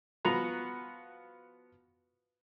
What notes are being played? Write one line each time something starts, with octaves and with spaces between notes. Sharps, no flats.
F3 B3 F#4 A#5